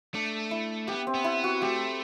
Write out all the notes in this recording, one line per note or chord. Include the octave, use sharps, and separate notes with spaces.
A3 D4
E4
B3 G4
C4
B3
E4
F#4
A3 G4